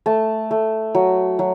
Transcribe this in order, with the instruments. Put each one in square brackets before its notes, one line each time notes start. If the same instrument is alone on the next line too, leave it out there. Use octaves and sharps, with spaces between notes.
[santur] A3 A5
A3
F#3
F#3